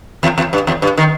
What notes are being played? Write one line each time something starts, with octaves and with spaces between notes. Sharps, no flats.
E2
E2
G2
E2
G2
D#3